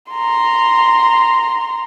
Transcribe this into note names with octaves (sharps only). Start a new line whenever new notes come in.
A#5 C6